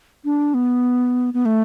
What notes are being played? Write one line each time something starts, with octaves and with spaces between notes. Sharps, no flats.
D4
B3
B3
A3